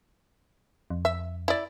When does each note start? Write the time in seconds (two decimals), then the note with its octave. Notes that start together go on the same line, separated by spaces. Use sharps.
0.90 F2
1.05 E5
1.48 E4 D5